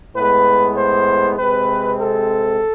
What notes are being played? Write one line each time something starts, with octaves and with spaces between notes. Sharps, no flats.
A2 G#3 B3 B4
C5
C3 G#3 C4 B4
A4